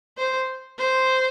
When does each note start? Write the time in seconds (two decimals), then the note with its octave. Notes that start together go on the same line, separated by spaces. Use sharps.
0.18 C5
0.79 C5